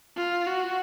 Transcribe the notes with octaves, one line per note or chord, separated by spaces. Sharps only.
F4
F#4